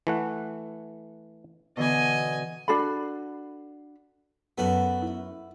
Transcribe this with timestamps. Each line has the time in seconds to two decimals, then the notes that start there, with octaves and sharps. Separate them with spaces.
0.07 E3 A3 F#5
1.77 B2 D3 E3 D#5 G#5
2.68 D4 F#4 A4 B5
4.58 F#2 A3 B3 F#4 A4 B4
5.02 E4